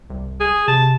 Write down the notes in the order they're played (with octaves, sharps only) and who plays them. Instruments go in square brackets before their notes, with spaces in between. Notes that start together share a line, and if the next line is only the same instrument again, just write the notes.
[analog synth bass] C2
[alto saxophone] G#4
[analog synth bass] C3 [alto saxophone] A5